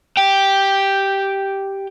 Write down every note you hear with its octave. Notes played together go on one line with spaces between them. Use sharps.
G4 G5